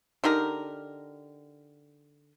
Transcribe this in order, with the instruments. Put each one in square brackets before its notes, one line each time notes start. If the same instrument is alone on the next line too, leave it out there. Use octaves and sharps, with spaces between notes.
[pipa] D3 D#4 G4 A#4